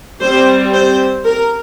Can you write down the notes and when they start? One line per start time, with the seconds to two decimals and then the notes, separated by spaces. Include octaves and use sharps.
0.22 G3 C4 C5
0.73 C5
1.24 A#4